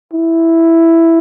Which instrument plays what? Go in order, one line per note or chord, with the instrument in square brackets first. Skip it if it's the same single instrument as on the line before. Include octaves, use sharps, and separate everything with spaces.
[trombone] E4